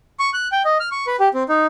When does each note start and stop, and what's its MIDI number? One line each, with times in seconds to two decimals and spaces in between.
0.19 0.30 85
0.33 0.48 90
0.52 0.62 79
0.65 0.78 75
0.80 0.89 89
0.92 1.06 85
1.07 1.16 71
1.20 1.28 67
1.34 1.43 60
1.49 1.66 63